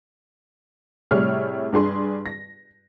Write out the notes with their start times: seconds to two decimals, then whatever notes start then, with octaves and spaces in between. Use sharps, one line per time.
1.11 A2 C3 G3 G#4 C#5 F6
1.72 G2 D4 G#4 C6
2.26 A#6